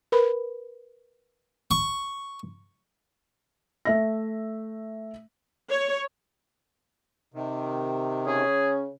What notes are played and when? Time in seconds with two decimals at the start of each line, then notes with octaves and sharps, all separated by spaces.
0.12 A#4 B4 B5
1.71 C#6
3.85 A3 E5 A#6
5.70 C#5
7.34 C3 D#3
8.26 C#3 C#4 G#4